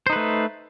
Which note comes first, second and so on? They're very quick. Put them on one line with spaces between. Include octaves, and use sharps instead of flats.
C5 D#4 B4 A3